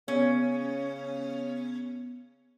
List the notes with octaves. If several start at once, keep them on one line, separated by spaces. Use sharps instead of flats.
C#3 B3 C#4